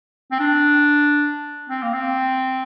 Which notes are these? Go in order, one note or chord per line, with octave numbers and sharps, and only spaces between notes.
C4
D4
C4
A#3
C4